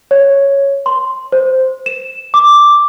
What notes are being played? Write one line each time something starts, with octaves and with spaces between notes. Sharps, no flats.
C#5
C6
C5
E7
D6